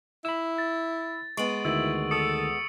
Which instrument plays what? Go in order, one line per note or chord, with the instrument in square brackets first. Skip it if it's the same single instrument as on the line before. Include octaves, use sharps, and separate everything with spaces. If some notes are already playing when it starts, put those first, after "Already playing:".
[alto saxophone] E4 [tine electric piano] B5 E6
[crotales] A6
[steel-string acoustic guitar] G#3 B3 [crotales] C#6 D7 F#7
[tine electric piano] D2 D#3 [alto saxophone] E4 [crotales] E6
[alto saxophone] A4 [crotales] C#6 D#6 C#7